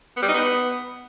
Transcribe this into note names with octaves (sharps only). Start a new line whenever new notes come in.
B3
G3
D#4
B3